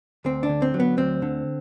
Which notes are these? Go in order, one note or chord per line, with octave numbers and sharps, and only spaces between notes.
D2 C4
D4
D3
C4
F#3
B3
D2 C4
D3